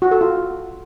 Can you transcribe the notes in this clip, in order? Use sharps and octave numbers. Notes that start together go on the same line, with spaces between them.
F#4
A4
F4